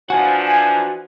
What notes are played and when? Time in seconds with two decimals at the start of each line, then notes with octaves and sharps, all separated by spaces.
0.10 E3 F3 D4 F#4 F#5 G#5
0.47 G#5